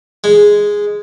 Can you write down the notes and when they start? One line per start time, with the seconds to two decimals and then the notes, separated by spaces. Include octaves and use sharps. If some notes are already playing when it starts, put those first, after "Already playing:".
0.24 G#3